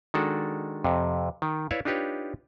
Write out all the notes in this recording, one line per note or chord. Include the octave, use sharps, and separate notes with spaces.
D#3 G#3 D4 F#4 A4
F2 C3
D#3
E4 B4 C#5 D5 E5 F5
D4 D#4 F4 G4 B4 C#5